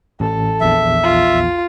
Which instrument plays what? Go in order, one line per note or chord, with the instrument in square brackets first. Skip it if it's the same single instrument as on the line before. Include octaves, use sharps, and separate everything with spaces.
[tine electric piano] A1 [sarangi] A4
[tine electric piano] A#1 E2 [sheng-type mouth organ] E5
[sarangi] F4